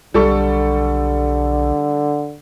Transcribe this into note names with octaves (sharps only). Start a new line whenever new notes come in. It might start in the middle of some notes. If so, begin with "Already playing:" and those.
B1 D3 G3 A4 C#6